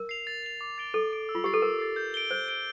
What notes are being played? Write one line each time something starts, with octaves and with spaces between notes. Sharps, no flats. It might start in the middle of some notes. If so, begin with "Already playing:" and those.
Already playing: A#4
C7 F7
A6
C7 F7
D6
A6 D7 G7
A4 D6
A6 D7 G7
E6
F4
G4 A6 C7
A4
A#4 E6
A6 C7
G6
D7 G7
C5 G6
D7 G7